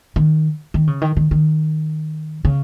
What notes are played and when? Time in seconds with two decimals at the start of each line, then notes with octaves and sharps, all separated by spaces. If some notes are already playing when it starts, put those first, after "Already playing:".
0.16 D#3
0.74 D#3
0.87 C#3
1.02 D#3
1.17 D#3
1.31 D#3
2.45 C#3